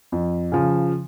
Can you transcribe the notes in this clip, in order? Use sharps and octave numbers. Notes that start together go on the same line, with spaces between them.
F2
C#3 F3